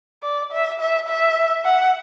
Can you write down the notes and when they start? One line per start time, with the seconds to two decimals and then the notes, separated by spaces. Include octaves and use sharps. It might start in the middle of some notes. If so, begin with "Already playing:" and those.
0.23 D5
0.52 E5
0.80 E5
1.08 E5
1.65 F#5